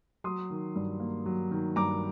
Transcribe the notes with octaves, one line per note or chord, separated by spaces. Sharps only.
F#3 C6 D#6
D#3
G2
A#3
F#3
D#3
G2 A#5 D6